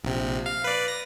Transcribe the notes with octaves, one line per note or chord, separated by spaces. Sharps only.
A#1 C3
F5
B4 D5
A#6